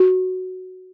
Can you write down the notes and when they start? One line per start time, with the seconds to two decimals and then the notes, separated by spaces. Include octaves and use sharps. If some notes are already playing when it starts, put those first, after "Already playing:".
Already playing: F#4